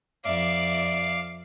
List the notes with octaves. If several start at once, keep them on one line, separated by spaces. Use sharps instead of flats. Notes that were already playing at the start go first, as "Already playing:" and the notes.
F2 D5 E5 F5 D6